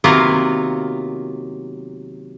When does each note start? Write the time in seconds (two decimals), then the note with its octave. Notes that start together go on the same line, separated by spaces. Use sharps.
0.04 C3 D#3 F#3 A#3 B3 F4